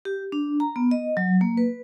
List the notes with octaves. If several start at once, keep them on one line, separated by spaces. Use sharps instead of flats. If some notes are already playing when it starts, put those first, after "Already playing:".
G4
D4
A#5
B3
D#5
F#3
A#3
B4